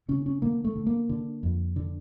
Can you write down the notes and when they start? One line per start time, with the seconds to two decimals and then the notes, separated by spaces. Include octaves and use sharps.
0.08 C#3 C#4
0.26 C#4
0.42 D3 A#3
0.64 A3
0.75 D3
0.87 A#3
1.09 D3
1.43 F2
1.76 D3